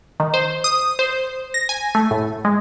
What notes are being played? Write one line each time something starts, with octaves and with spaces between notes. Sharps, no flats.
D#3
C5
D#6
C5
A#6
G#5
A3
A2
G#3